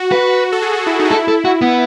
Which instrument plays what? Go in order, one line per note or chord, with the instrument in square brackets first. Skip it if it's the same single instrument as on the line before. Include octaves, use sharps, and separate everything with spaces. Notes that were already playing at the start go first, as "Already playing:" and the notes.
Already playing: [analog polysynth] F#4
[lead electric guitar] B4
[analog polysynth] A4
G#4
F#4
E4
D#4
F#4
[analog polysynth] E4 [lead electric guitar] A4
[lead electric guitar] A4
F#4
B3